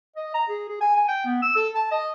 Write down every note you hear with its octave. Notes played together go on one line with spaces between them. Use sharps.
D#5
A#5
G#4
G#4
G#5
G#5
G5
B3
E6
A4
A5
D#5